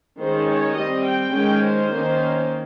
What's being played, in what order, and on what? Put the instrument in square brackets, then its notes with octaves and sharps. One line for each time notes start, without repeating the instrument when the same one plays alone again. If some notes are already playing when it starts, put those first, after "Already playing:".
[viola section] D#3 G#3 C#4 C5
C#5
G3 C4 D#5
G5
D#3 G#3 C#4 G5
C5
D#3 A#3 C#4